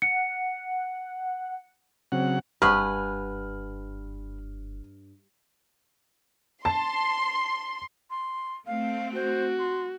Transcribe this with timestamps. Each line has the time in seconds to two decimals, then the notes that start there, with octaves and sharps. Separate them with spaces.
0.02 F#5 C#7
2.12 C#3 F#3 C4 F#5
2.62 F#1 G2 B4 F#5 G#5 F6
6.65 A5 C6
8.10 C6
8.67 A3 C4 F5
9.15 F#4 C5
9.59 C6